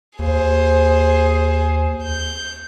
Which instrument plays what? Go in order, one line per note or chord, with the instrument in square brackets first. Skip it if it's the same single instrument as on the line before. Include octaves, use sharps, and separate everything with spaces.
[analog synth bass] D#2 [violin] G#4 C5
[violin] G6